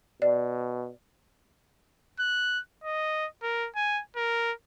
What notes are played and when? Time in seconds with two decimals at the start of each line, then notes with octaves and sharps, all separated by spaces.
0.22 B2 D5
2.20 F#6
2.84 D#5
3.43 A#4
3.76 G#5
4.16 A#4